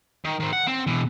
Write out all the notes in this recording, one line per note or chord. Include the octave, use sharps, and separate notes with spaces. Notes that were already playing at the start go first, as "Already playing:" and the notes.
D#3
D#3 C4
F#5
C4
B2 E3